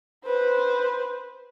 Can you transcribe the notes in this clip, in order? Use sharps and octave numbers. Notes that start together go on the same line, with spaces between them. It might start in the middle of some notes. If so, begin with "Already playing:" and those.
B4 C5